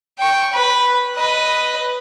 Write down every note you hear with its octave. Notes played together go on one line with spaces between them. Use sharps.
G5 C#6
B4
B4 D#5